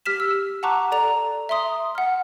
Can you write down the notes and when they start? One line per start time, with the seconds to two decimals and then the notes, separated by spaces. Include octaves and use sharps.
0.06 G4 F6 B6 E7
0.20 E6
0.63 F#5 A5 A#5 C#6 D6 F#6
0.91 A4 D5 A#5 F7
1.49 E5 A#5 C6 D#6
1.95 F#5 F6